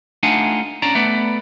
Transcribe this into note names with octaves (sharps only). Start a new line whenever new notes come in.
A3 D4 D#4 F4 F#5 G#5
C#4 D4 D5 A#5
A3 B3 B4 D5